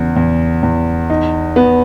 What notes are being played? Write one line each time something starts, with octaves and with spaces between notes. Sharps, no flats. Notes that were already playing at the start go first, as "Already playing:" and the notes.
Already playing: E2 C#3
E2
E2
D#4
B3